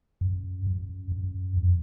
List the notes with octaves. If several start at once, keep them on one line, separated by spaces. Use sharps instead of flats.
F#2
F#2
F#2
F2